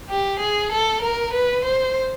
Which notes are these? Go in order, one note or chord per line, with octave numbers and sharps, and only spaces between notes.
G4
G#4
A4
A#4
B4
C5